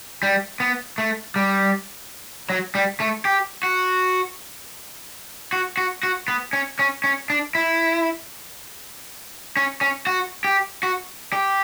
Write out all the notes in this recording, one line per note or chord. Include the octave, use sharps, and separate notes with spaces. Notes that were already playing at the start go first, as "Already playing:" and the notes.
G3
B3
A3
G3
F#3
G3
A3
G4
F#4
F#4
F#4
F#4
B3
C#4
C#4
C#4
D4
E4
C#4
C#4
F#4
G4
F#4
G4